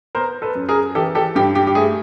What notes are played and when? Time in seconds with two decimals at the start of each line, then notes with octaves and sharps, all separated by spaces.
0.15 B3 A#4 C5
0.42 A4 B4
0.55 F#2
0.69 G#4 A#4
0.95 E3 G4 A4
1.15 G4 A4
1.35 G2 G4
1.55 G4
1.67 G4
1.75 A3 G#4